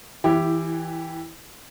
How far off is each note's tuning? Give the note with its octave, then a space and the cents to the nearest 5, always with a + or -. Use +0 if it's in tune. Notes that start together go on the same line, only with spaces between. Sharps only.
E3 -10 E4 +15 G4 +0